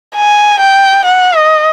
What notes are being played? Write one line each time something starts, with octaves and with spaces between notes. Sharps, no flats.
G#5
G5
F#5
D#5